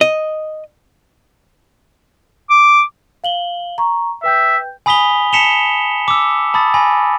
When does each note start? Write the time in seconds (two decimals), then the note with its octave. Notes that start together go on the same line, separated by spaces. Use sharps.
0.01 D#5
2.50 D6
3.24 F5 F#7 G7
3.78 A#5 C#6
4.24 B4 E5 G5 G6
4.86 G#5 B5 D#6 B6 F7 G7
5.33 A5 B6 C#7 E7 F7 G7
6.08 D6 E6
6.54 A5 B5 D#6 A6
6.74 G#5 B5 A#6